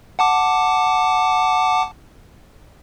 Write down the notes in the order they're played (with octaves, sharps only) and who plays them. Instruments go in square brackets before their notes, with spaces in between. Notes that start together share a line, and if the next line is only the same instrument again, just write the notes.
[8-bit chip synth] F#5 A5 D6